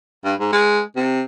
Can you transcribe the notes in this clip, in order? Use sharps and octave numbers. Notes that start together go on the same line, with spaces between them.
G2
G#2
G#3
C3